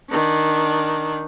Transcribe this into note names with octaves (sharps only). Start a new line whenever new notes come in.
D#3 D4